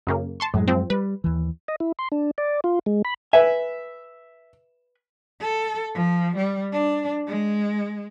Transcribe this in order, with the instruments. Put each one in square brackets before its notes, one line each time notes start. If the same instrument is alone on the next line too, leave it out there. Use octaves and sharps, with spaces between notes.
[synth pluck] F#2 C#3 A#3
A5 C6 C#6
[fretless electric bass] F#2 F#3 G#3 [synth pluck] A2
[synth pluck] F3 C4
[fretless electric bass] G3 [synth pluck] B4
[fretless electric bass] D#2 E3
[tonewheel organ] D#5
E4
C6
D4
D5
F4
G#3
B5
[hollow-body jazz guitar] B4 G#5 [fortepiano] E5
[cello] A4
F3
G3
D4
G#3